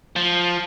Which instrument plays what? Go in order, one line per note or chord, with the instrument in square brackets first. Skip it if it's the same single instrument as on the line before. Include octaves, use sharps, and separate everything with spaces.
[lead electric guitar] F3